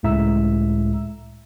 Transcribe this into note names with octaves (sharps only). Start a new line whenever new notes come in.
C#2 A2 G#3 E5 A#5 E6